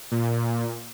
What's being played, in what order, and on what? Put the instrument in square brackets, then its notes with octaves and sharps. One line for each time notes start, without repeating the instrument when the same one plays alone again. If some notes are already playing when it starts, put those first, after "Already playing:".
[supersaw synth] A#2